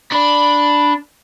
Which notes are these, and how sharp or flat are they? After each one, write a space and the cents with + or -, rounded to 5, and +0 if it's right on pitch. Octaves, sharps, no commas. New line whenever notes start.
D4 +0 B5 +0